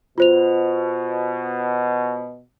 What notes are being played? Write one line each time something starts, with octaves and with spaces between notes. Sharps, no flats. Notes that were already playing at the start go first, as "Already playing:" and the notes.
B2 F4 C5 F7